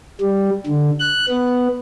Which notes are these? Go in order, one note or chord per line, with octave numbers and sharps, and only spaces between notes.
G3
D3
F#6
B3